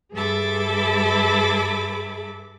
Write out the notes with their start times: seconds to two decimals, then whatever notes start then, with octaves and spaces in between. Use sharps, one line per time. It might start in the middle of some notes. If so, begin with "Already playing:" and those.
0.13 G2 G#4 A4 E5 B5 D6